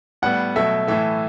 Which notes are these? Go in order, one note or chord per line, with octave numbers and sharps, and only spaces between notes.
A2 G3 B3 F#5
B2 F#3 A3 E5
A2 E3 A3 E5